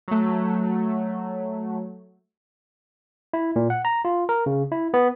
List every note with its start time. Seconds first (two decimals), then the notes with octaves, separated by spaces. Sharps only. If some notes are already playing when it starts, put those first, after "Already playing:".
0.08 F#3 A3
3.33 E4
3.56 A#2
3.70 F#5
3.85 A#5
4.05 F4
4.29 A#4
4.46 C#3
4.72 E4
4.94 B3